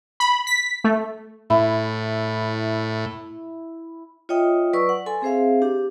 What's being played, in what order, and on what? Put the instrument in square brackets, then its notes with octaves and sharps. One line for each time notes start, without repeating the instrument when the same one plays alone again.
[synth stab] B5
B6
A3
[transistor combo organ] A2 [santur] E4
[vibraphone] F4 C#5 D#5 E5 G5 D#6
F#3 B4 D5 C#6 E6
F#5
A4 G#5 C6
C4 G#4 C5 E5 F5
D4 G4